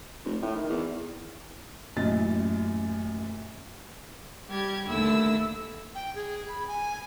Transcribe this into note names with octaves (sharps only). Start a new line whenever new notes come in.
F1
A2
D#3
E2
A1 F#2 A#2 E4 D#5 A6
G3 G4 G#6
D#2 D3 A3 E4 E6
G5
G#4
B5
G#5